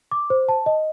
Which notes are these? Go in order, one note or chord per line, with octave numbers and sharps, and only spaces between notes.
D6
C5
A5
D#5